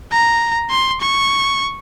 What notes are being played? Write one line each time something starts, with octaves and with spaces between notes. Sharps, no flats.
A#5
C6
C#6